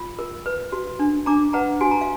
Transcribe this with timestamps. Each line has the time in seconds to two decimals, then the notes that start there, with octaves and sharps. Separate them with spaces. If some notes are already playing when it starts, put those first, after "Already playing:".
Already playing: F4
0.19 A#4
0.46 B4
0.72 F#4
0.99 D4
1.26 D4 A#5 D6
1.53 B4 F#5 A#5
1.81 F#4 G#5
1.91 A#5
2.01 F5